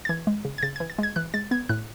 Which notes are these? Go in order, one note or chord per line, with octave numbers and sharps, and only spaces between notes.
A6
E3 G#6
G#3
C#3
G#6
C#3 A6
E3 G#6
A6
G#3 G#6
E3 F#6
G#3 A6
B3 G#6
A2 F#6